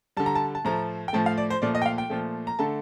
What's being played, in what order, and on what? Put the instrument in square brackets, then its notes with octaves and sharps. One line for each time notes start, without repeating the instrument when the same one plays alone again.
[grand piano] D3 G3 A5
A#5
A5
A5
A2 F3 A3 A#5
G5
A2 F3 A3 A5
F5
D5
C5
A#2 F3 A3 D5
D#5
G5
F5
G5
A#2 F3 A3
A#5
D3 A3 A5